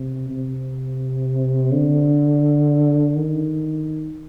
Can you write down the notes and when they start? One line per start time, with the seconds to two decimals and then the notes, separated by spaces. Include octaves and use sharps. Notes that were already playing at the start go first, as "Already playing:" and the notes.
Already playing: C3
0.30 C3
1.72 D3
3.16 D#3